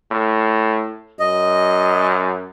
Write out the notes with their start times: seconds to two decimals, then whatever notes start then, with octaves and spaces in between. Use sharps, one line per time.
0.11 A2
1.20 F#2 D#5